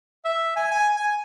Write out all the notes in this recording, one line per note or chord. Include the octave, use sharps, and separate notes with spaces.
E5
G#5
G#5
G#5